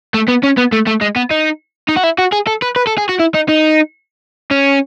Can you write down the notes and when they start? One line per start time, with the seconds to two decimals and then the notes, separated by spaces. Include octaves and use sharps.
0.14 A3
0.28 B3
0.43 C#4
0.57 B3
0.72 A3
0.87 A3
1.01 G#3
1.16 B3
1.31 D#4
1.88 D#4
1.96 F#4
2.03 E4
2.18 F#4
2.32 G#4
2.47 A4
2.62 B4
2.76 B4
2.87 A4
2.98 G#4
3.09 F#4
3.20 E4
3.34 D#4
3.49 D#4
4.51 C#4